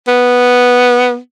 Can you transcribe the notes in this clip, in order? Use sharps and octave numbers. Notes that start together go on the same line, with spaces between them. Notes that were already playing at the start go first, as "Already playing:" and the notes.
B3